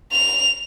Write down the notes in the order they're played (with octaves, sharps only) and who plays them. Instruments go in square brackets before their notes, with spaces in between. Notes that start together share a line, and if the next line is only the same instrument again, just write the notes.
[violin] F7